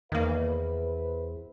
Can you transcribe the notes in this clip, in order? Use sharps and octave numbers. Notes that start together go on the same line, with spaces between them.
E2 D#3 A#3 B4 C5 E5